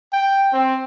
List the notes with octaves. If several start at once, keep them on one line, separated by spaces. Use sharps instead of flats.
G5
C4